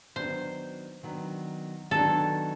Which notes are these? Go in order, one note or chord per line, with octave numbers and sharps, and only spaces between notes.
D#3 F#3 B3 D4 C5
D#3 F#3 B3 D4
D#3 F#3 B3 D4 A4